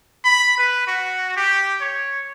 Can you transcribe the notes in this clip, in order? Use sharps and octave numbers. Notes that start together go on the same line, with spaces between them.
B5
B4
F#4
G4
C#5